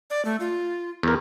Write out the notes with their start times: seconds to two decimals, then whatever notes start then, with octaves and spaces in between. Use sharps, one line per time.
0.10 D5
0.25 A3
0.40 F4
1.03 E2 A#4